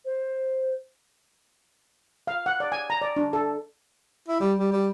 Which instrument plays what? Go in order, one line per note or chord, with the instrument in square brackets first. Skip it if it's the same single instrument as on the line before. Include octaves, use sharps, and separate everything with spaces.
[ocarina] C5
[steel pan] F5
F#5
D5
G#5
A#5
D5
D4
A4
[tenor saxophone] E4
G3
G3
G3